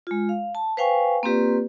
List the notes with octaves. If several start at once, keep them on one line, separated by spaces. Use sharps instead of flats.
G#3 F4
F5
A5
B4 C5 F5 G5 G#5 C#6
A#3 C4 F4 G4 B4 D5